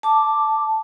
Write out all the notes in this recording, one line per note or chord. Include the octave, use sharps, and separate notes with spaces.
A5 D6